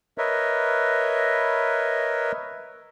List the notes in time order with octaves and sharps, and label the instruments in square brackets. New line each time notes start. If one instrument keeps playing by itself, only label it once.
[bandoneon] A#4 B4 C#5 D#5 E5